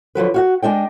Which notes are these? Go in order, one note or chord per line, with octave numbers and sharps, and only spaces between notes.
D3 F3 F#3 B4
F#4 F5 F#5
G#3 D4 D#5 G5